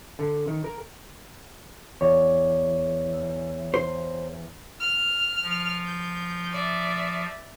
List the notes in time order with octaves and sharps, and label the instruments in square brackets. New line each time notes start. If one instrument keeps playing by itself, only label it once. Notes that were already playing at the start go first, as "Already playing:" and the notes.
[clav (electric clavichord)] D3
D#3
A#4
[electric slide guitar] E2 [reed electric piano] C#5 D5
[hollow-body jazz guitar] C5
[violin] F6
[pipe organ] F3
[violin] G6
D5 E5